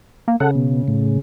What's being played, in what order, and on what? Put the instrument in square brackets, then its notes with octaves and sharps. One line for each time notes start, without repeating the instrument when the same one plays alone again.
[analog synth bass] A#3
[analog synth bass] C#3 [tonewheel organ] A4 F#5
[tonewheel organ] B2
A2